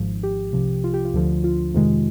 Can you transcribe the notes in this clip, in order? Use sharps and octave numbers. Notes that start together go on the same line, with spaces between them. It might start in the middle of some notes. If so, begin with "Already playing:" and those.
Already playing: G#1 G#2 F3
G4
C2 C3 F3
F4
G4
F4
D2 D3 F3
F4
F2 C3 D#3 G#3